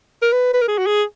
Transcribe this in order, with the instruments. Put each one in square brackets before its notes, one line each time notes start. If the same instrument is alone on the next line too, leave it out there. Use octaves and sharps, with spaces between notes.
[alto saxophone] A#4
B4
B4
A#4
G#4
F#4
G#4